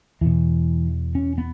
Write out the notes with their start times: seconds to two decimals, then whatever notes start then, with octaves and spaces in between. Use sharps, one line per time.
0.21 E2 B2 E3
1.15 C#4
1.38 B3